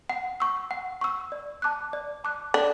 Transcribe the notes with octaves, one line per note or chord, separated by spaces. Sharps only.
F#5
C#6 E6
F#5
C#6 E6
D5
A5 D6 F#6
D5
A5 D6 F#6
D4 A4